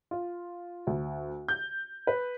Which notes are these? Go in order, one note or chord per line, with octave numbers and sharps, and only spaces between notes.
F4
D2
G6
B4